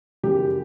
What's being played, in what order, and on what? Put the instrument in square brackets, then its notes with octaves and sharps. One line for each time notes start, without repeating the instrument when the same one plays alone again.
[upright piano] F#2 C#3 E3 G4